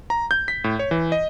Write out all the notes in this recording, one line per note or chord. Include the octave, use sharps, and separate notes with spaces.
A#5
G6
B6
A2
C#5
E3
D#5